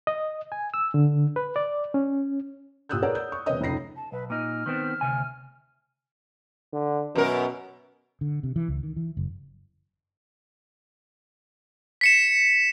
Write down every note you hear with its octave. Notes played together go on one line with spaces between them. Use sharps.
D#5
G#5
E6
D3
B4
D5
C#4
A#2 G4 D#6 E6 F#6 G6
G#4 A#4 B4 C#5 D5 F#5
G6
C#6
E1 C3 B4 C#5 D#5 D#6
F1 C#2 D#4 A#6 C7
A5
B1 B4
A#2 D#4 F6
D#3 B3 C4
D2 C3 G#5
D3
F#2 B2 A#4
D3
C3
E3
C#2
D#3
E3
F#1
B6 C#7 E7